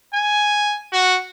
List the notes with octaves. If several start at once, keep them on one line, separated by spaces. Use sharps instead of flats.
G#5
F#4